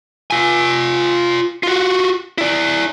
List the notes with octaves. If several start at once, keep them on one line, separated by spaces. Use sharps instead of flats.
F4 G#5
F4 F#4
E4 D5